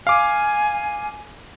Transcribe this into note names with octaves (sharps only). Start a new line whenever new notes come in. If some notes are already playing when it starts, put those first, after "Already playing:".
F5 G#5 D6